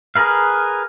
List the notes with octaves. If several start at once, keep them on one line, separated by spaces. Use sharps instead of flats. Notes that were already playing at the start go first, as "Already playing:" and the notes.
G#4 A#4 B4 F5